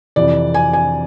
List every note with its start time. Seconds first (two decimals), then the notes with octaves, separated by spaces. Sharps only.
0.16 F2 C3 E3 D5
0.54 G#5
0.73 G#5